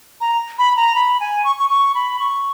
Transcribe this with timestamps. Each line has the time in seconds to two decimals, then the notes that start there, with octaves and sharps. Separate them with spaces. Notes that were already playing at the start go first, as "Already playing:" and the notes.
0.21 A#5
0.59 B5
0.77 A#5
0.95 B5
1.20 G#5
1.44 C#6
1.59 C#6
1.70 C#6
1.95 B5
2.20 C#6